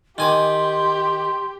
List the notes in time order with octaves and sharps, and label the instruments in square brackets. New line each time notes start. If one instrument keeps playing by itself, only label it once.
[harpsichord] D#3 G#5 D6 [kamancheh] G4 [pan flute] C6